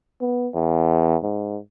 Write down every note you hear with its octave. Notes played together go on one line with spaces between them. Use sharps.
B3
E2
G#2